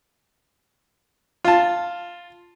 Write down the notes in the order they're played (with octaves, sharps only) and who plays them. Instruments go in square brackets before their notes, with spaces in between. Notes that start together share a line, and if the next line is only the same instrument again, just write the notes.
[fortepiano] F4 A5